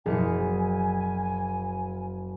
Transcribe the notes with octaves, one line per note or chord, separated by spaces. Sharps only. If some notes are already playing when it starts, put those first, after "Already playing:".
F#1 B2 F3 G#4 G#5 C#7